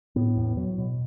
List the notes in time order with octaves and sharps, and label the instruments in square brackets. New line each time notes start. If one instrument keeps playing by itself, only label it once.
[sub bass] A2 [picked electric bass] B3
[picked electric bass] E2
F#3
B2